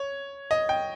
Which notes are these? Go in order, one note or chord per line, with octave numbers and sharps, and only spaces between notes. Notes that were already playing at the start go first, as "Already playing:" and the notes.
Already playing: C#5
D#5
G5